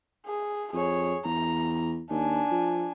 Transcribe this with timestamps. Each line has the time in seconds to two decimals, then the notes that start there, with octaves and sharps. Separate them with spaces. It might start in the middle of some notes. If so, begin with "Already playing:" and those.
0.27 G#4
0.73 F2 G#4 C#5
1.25 E2 A#5
2.11 D#2 D4 G#5
2.51 F3